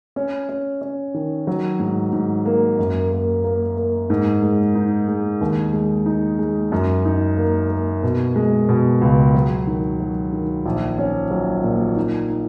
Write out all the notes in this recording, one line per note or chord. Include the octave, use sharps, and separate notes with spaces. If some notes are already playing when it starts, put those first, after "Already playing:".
C#4
C#4
C#4
D#3
F#3
G#2
G#2
A#3
F#2
A#3
A#3
A#3
G#2
G#3
D#4
G#3
D#2
G#3
D#4
G#3
F#2
D#4
A#3
A#3
B2
G#3
B2
C#2
F#3
D#3
F#3
D#3
A#1
C#4
F#3
A#2
D#4
D#4